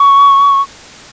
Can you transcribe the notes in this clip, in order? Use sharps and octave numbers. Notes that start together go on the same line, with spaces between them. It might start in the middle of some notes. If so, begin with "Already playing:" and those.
Already playing: C#6